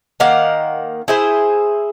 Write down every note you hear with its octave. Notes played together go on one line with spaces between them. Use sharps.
D#3 A#3 F5 F#5
E4 G#4 C5